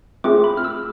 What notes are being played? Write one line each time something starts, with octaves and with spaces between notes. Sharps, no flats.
A3 C4 F4 G#4 D6
B5
F6
E6